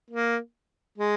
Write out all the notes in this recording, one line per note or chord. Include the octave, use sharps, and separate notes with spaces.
A#3
G#3